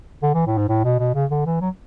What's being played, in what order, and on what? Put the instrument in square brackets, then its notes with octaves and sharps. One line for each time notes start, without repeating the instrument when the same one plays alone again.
[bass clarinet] D3
E3
A2
G#2
A2
B2
B2
C#3
D3
E3
F#3